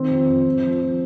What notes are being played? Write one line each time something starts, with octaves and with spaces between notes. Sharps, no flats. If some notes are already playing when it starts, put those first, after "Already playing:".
Already playing: D#3 C4 C5
F2
F2
F3
F3
F3